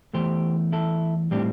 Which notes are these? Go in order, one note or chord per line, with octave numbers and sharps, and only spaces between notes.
E2 E3 A3 G4 C5
E4 A4
A2 G3 C4 D4 G4